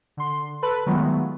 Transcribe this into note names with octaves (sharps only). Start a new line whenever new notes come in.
D3 C6
A4 B4 B5
D#3 F#3 G#3 A3 B3 F4